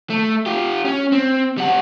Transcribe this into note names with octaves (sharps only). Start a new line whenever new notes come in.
A3
F4 G4
C#4
C4
G3 F#5